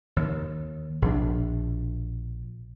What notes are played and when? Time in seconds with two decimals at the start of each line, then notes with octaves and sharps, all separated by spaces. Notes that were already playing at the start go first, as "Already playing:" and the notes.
0.16 D#2
1.02 A#1 B2 D4